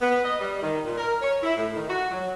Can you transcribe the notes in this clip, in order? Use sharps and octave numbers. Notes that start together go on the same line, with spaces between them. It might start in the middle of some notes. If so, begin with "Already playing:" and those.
B3
D#5
G3
D#3
A#2
A#4
C#5
E4
A2
D#3
F#4
F#3